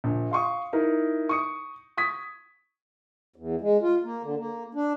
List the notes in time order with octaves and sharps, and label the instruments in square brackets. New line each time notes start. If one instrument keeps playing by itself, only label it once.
[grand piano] A#1
F5 C6 C#6 D#6
D#4 E4 A#4
C#6 D#6 C#7
C#6 D#6 G#6 B6
[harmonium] E2
G#3
F4
A#3
D3
A#3
D4